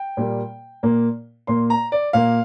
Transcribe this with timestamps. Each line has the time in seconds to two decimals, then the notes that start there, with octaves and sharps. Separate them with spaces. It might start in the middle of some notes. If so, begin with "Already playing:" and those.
Already playing: G5
0.17 A#2 G3 A#3
0.83 A#2 A#3
1.47 A#2 A#3 C6
1.70 A#5
1.92 D5
2.13 A#2 A#3 F5